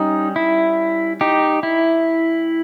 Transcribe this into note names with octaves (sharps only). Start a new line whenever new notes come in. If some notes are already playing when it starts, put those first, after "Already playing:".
Already playing: G3 C#4 D#4
E4
D#4 G4
E4